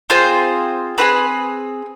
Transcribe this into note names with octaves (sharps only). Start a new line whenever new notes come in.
C4 F4 G#4 C5
C4 F4 G#4 B4